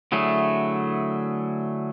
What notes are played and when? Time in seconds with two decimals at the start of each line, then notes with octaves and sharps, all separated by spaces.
0.12 D3 F#3 A3 E4 G#4